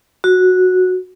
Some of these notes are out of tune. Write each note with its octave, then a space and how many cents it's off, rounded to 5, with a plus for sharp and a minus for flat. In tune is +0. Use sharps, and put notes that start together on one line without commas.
F#4 -10